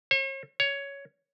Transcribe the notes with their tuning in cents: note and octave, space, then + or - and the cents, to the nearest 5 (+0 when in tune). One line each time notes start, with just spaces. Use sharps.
C#5 -45
C#5 +10